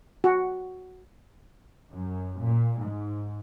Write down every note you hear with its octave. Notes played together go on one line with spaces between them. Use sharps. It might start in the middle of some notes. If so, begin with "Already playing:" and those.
F#4
F#2
A#2
G#2